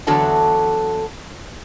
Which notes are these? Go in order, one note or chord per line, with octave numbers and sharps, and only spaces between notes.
E2 D3 F#3 F#4 A4 A5